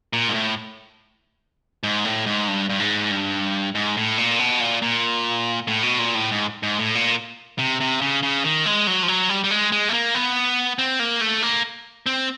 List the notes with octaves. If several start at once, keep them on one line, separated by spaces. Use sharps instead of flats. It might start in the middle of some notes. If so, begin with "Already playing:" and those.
A#2
G#2
A2
G#2
A2
G#2
G2
G2
G#2
G2
G#2
A2
A#2
B2
A#2
A#2
A2
B2
A#2
A2
G#2
G#2
A2
A#2
C3
C3
C#3
C#3
D#3
G#3
F#3
F3
F#3
G3
G3
G#3
G#3
A3
A#3
B3
C4
A#3
A3
A#3
C4